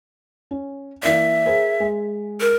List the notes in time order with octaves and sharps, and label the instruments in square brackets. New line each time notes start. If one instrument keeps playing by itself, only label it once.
[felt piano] C#4
[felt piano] E3 A#3 D5 [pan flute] E5
[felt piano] G#4 A#4 C5
G#3
[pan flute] A#4